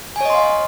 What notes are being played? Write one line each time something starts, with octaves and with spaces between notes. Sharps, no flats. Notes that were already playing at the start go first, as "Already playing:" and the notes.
C#5 D#5 F5 G#5 C6